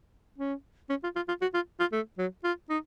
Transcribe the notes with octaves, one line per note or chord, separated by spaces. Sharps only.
C#4
C#4
F4
F4
F4
F#4
F4
F4
A3
F#3
F4
D#4